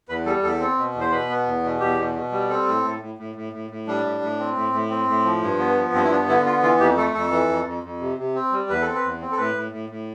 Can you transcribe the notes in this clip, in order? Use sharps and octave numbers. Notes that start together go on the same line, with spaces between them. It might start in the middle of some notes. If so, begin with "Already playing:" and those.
E2 B4
G3 A4
E2 A4
C4
B2
E2
C5
B2 B4
B3
E2
B2
E2 G4
B2
B2
G3
C4 A4
A2
A2
A2
A2
A2
A2
A2
G3 D4
A2
A2
C4
A2
A2
C4
A2
F3
G2
B3
F3
G2 C4
E4
B3 D4
D3 E4
B3 F4
E3 F4
F2 G4
A3 A4
F2 A4
E3
F2
F2
F2
C3
C3
C4
G3
E2 B4
C4 A4
B4
E2
C4
A4
A2 B4
A2
A2
A2